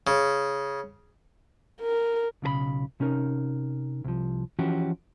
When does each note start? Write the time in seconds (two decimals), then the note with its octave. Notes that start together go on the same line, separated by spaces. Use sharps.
0.07 C#3
1.81 A#4
2.42 B1 C#3 G#4 B5
3.00 C3 C#4 D#4 A#4
4.04 C2 F3
4.59 E3 F3 C#4 F#4 G4